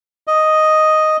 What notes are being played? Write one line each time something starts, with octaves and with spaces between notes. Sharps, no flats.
D#5